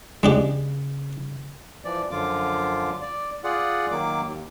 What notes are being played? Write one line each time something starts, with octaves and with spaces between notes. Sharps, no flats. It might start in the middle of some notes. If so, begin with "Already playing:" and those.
C#3 G#3 D4 G4
E3 F3 D5
F#2 D3 F3 F4 D6
D5
F4 G#4 D5 F#5
D#3 F#3 A#3 D6
D#2